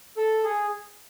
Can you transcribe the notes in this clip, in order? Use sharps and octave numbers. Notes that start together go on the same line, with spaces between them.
A4
G#4